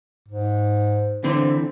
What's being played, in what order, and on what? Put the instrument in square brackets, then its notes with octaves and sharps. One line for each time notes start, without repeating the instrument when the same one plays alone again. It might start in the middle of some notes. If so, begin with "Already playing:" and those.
[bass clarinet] G#2
[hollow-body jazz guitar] D3 E3 C4